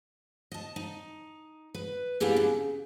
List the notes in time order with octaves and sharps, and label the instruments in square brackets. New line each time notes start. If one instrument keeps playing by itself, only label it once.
[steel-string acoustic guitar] D#5 A5
D#4
B4
A#3 B3 D4 E4 G4 G#4
C#3